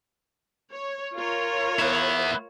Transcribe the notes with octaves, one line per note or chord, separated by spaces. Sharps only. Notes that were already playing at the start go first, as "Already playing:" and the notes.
C#5
F4 A#4 C#5
B3 E4